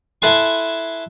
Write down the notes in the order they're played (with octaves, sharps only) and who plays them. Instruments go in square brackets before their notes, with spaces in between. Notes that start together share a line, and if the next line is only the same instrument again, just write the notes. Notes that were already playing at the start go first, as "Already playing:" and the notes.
[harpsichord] E4 A4 F#5 G#5 C6 C#6